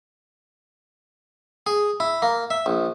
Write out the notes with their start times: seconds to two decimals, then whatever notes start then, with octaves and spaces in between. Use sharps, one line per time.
1.67 G#4
2.00 E4
2.22 A#3
2.51 E5
2.66 A#1